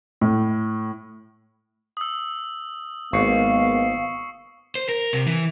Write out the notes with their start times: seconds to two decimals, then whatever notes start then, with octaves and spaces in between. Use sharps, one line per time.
0.21 A2
1.97 D#6 E6
3.13 G#1 G#3 A#3 B3 F5 C#6 C7 C#7
4.75 C5
4.89 A#4
5.13 C3
5.27 E3